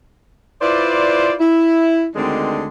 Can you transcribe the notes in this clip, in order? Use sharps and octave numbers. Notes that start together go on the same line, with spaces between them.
E4 F4 B4 C5 D5
E4
D2 D3 D#3 G#3 C4 D4